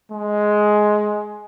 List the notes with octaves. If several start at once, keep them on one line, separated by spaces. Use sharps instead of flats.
G#3